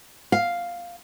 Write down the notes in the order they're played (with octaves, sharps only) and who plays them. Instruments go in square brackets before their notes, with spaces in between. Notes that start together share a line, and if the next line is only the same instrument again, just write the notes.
[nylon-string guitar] F5